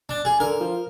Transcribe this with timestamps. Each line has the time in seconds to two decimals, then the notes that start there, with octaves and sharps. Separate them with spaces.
0.09 D4
0.25 G#4
0.40 D3 A#4
0.61 F3